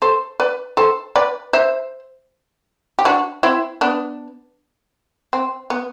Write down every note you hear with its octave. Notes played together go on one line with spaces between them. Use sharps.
A4 C5
B4 D5
A4 C5
B4 D5
C5 E5
G4
D4 F#4
C4 E4
B3 D4
C4
B3